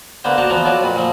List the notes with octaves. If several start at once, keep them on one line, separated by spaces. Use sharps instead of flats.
D3 A#3 B3 C5
F#4 C5 D5 A5 A#5
E3 F3 B3 A#5
C#4 F4 F#4 A4 D5
F2 A#2 B5
A#2 F3